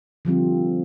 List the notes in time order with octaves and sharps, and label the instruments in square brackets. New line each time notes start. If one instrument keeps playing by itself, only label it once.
[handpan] D3 F3 G3 C4